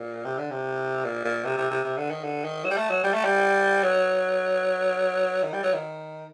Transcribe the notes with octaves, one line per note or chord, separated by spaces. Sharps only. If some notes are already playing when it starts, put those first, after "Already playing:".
Already playing: A#2
C3
D3
C3
A#2
A#2
C3
C3
C3
C3
D3
D#3
D3
D#3
F#3
G3
A3
F#3
G3
A3
G3
F#3
D#3
G3
F#3
D#3